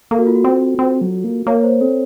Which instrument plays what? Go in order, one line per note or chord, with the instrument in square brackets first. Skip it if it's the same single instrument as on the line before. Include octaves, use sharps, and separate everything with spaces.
[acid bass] A#3 [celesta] A4
[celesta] F#4
F4
F#4
[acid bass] C4
C4
F#3
A#3
[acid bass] A#3 [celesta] C#5
[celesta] C5
[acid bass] C4 [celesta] A4